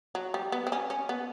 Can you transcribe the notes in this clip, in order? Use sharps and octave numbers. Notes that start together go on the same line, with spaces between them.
F#3
G3
B3
C4
C#4
C#4
B3